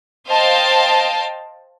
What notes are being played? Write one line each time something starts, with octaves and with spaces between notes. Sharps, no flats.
C5 D#5 F5 G5 A5